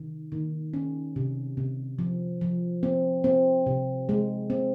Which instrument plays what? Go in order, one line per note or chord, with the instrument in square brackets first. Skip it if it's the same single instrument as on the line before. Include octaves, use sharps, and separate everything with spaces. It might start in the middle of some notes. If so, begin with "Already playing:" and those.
Already playing: [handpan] C3 D#3
D#3
C#4
C3
C3
F3
F3
C4
C4
C3
G#3
C4